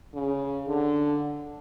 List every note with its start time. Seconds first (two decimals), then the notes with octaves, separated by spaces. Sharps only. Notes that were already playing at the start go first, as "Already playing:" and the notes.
0.14 C#3
0.68 D3